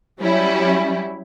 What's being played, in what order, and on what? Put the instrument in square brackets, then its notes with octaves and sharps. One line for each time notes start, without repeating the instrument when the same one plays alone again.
[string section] F#3 G3 C#4 E4